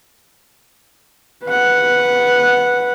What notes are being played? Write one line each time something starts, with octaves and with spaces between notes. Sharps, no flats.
B4 F#5